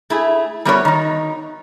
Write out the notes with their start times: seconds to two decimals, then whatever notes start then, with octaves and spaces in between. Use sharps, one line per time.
0.10 A3 E4 G#4
0.65 G3 A3 B3 F#4 A#4 C#5
0.85 D#3 D#4